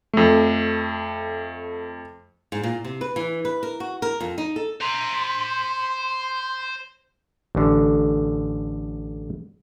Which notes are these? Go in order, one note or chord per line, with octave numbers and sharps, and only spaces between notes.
F2 A3
G#2
A#2
C3
B4
E3
B4
A#4
F#4
A#4
F2
D#4
A4
C5 A#5 C6
A1 D3